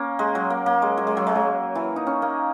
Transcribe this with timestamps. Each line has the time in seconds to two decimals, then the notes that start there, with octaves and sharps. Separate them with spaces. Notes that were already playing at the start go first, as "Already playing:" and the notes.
Already playing: A#3 C#4
0.19 G#3
0.35 F#3
0.50 A#3
0.66 A#3
0.82 G#3
0.97 F#3
1.07 G#3
1.17 F#3
1.27 G#3
1.36 F#3
1.75 E3
1.96 D#4
2.07 C#4
2.22 A#3